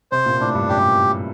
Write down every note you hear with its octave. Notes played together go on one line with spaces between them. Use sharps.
C3 C5
A#2
A2 D4
G2
F#2 G4